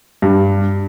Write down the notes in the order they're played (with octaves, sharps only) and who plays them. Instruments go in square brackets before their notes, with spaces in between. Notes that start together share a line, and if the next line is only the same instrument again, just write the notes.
[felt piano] G2